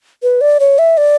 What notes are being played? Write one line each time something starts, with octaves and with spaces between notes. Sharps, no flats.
B4
D5
C#5
E5
D5